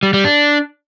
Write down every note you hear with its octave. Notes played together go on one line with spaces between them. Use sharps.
G3
G3
D4